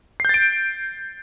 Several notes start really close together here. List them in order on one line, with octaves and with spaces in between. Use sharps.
C7 G6 A6 D7